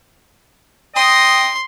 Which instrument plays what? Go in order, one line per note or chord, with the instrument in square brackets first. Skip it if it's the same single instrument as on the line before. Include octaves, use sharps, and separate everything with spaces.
[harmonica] D#5 G5 D#6 [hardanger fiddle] C6